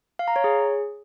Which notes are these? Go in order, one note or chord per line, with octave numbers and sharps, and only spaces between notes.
F5
A#5
C#5
G#4